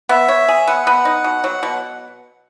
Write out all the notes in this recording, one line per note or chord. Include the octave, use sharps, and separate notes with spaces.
B3 E5
C#5
G#4
B3 F#5
B3
D#4
B2
F#3
B2